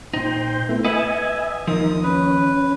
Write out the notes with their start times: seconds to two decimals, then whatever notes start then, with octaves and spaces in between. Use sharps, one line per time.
0.14 A#2 D#4 C5 G5
0.69 A3 B3 E4
0.85 B4 D#5 E5 F#5 G#5 B5
1.67 D#2 F3 D#4 A#4 D#6
2.04 C#4 B4